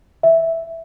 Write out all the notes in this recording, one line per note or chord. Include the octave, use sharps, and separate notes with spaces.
E5